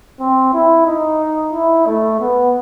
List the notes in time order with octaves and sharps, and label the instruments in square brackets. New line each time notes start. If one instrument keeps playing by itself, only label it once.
[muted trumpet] C4
E4
D#4
E4
A3
B3